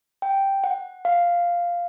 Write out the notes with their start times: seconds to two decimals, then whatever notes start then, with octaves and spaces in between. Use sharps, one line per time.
0.22 G5
0.64 F#5
1.05 F5